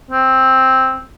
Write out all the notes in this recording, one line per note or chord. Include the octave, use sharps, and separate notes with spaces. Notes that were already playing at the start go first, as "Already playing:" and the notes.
C4